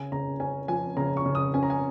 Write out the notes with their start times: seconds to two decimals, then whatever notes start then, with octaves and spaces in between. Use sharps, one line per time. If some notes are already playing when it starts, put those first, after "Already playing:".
Already playing: C#3 G#5
0.12 C#3 A#5
0.40 C#4 G#5
0.68 F3 G#5
0.97 C#3 A#5
1.17 C#6
1.26 C#3
1.35 D#6
1.54 C#4 G#5
1.63 A#5
1.70 G#5